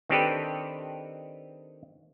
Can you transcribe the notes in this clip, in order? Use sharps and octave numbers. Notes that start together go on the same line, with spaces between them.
D#3 C4 D4 G4 A4 B4